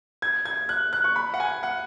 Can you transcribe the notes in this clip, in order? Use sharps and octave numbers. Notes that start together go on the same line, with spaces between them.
G#6
G#6
F#6
F#6
C#6
B5
F#5
G#5
F#5